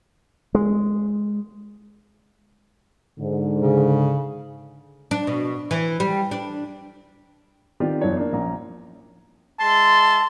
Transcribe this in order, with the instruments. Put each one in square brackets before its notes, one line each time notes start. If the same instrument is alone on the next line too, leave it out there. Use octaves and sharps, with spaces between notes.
[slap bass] G#3
[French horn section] G#2 D3
[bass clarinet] C#3
[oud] D4
B2
E3
G3
D4
[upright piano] D#3 B3 C4 F4 G4 D5
F#1 E2 E3 D4 C#5
A#3 D4
A#1 C#4 A#5
[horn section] G#3 E5 C6 [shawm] A5